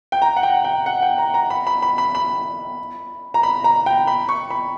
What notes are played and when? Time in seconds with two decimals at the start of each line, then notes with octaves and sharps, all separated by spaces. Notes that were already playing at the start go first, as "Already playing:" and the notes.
0.12 G5
0.22 A#5
0.36 F#5
0.43 G5
0.64 G5
0.86 F#5
1.02 G5
1.18 A#5
1.34 A#5
1.50 B5
1.67 B5
1.82 B5
1.98 B5
2.15 B5
3.34 A#5
3.43 B5
3.64 A#5
3.86 G5
4.07 B5
4.29 C#6
4.50 B5